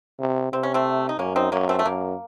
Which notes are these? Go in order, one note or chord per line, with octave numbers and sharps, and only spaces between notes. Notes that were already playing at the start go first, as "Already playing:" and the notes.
C3
C3 C4
C#4
A3 C4
D#4
F#2 A#3 C#4
C4 D#4
F#2 A#3 C#4
A3 C4
A3
F#2 A#3